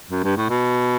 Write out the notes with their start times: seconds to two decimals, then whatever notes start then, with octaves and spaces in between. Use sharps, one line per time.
0.11 F#2
0.24 G2
0.37 A2
0.50 B2